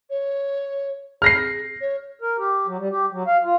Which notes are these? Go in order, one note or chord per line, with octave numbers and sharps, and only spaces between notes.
C#5
G#4 F6 A#6 C7
C#5
A#4
G4
F#3
G3
G4
F#3
F5
F4